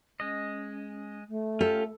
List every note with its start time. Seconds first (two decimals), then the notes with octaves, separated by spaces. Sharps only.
0.20 G#3 C#4 D#5
1.28 A3
1.61 C#4 F4 G4 A4